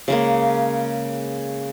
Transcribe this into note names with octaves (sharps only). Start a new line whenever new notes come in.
C#3 G#3 A#3